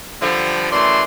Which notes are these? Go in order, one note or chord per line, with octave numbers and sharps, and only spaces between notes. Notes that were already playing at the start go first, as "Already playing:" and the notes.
D3 F3 G3
F#2 E3 A3 D5 C6